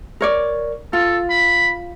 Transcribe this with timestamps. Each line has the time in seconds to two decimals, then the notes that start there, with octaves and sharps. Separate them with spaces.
0.21 A#4 C#5 D5
0.93 F4 A4
1.30 B5